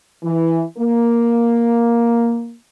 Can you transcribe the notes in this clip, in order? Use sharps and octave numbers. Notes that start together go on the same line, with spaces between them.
E3
A#3